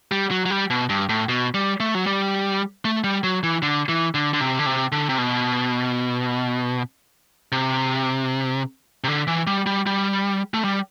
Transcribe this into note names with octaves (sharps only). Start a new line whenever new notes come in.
G3
F#3
F#3
G3
B2
G2
A2
B2
G3
A3
F#3
G3
A3
G3
F#3
E3
D3
E3
D3
D3
C3
D3
C3
D3
C3
B2
C3
C3
D3
E3
G3
G3
G3
A3
G3